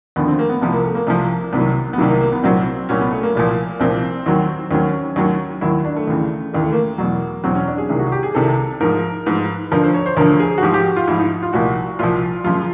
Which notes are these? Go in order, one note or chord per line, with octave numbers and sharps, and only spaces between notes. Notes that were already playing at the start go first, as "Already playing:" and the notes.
D#2 D3 F3 B3
C4
A#3
B3
C2 C3 F3 B3
A#3
A3
A#3
C2 C3 F3
C2 C3 D#3 F#3 B3
B3
C2 C3 D#3 F#3 A#3
A#3
A#3
B3
C2 A#2 F#3 C4
C2 A#2 F#3 C#4
B3
A3
A#3
C2 A#2 F3
C2 A#2 F3 C4
D#2 D#3 F#3
D#2 D#3 F#3 C#4
D#2 D#3 F#3
D#2 D#3 F#3 E4
D4
A3
D#2 C#3 E3
D#2 C#3 E3 A#3
A3
A#3
E2 B2 F#3
E2 B2 F#3 C4
C#4
D4
G#4
C2 C3 D#3
F#4
G4
G#4
C2 C3 D#3 A4
G#2 F3 A#4
G#2 F3 B4
D2 D3 F3 A#4
C5
C#5
C5
D2 D3 F3 A#4
G#4
F#4
G#2 F3 G4
G4
F#4
F4
G#2 F3 E4
D#4
F4
C2 A#2 F3 F#4
C2 A#2 F3 F4
F#2 C#3 F3 F4